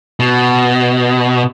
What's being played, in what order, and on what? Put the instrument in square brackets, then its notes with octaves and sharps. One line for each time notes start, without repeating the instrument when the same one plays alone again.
[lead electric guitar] B2